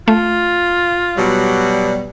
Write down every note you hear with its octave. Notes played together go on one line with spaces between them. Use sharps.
A3 F4
B2 F#3 G3